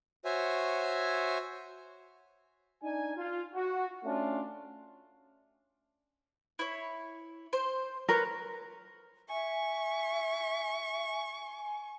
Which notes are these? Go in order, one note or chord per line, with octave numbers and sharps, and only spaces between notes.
F#4 C5 C#5 E5 G#5
D4 D#4 G#5
F4
F#4
A3 C#4 D4 F4
E4 C#5
C5
A#4 B4 C#5
E5 G#5 C#6